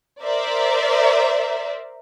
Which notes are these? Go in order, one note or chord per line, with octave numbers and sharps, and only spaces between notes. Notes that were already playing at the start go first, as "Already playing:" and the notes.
A#4 C5 D5 E5